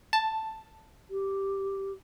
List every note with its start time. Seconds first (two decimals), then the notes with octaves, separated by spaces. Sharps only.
0.13 A5
1.10 G4